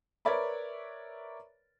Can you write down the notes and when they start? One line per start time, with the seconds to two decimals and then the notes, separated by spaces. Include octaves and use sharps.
0.25 A#4 B4 C#5 D5 E5 B5